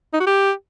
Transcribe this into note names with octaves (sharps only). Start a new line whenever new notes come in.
D#4
F#4
G4